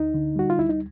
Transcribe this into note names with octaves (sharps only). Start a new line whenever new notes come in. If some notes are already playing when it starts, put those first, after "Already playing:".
Already playing: D2 D#4
D3
G3 F#4
F4
D2 E4
D#4